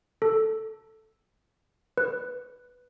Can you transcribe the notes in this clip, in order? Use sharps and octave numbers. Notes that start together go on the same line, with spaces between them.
A4
B4